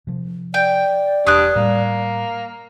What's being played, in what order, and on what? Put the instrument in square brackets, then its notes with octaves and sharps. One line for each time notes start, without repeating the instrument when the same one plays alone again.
[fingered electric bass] C3 F3
[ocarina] D5 [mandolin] G5
[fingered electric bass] E1 [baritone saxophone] G2 [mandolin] D#6 F#6
[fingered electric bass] A2 G3 [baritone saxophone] A#3